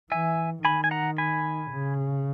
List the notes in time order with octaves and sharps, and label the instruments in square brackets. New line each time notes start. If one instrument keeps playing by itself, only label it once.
[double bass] E3 [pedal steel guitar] E5 G#5
[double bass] D#3 [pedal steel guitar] G#5 B5
[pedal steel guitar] G#5
F#5 A#5
G#5 B5
[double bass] C#3